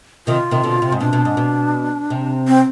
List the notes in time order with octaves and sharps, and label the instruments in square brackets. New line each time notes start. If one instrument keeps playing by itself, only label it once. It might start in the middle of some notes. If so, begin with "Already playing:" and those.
[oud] C3 D#3 [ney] F4
[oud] C3 D#3
B2 D3
C3
G#2
[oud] B2 [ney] D4
[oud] B2
G#2
B2
C3
[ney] C4